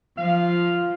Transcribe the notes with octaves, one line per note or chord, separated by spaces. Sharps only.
F3 F5